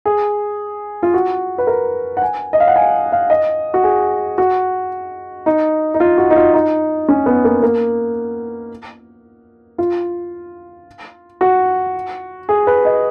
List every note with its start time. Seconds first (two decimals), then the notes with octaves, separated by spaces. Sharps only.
0.05 G#4
1.03 F4
1.14 F#4
1.58 B4
1.67 A#4
2.17 F#5
2.22 G#5
2.53 D#5
2.60 F5
2.68 F#5
2.76 G#5
3.12 F5
3.30 D#5
3.74 F#4
3.84 G#4
4.38 F#4
5.46 D#4
5.94 D#4
6.00 F4
6.18 F#4
6.30 D#4
6.36 F4
6.54 D#4
7.09 C#4
7.26 B3
7.44 A#3
7.63 A#3
9.78 F4
11.41 F#4
12.49 G#4
12.67 B4
12.85 D#5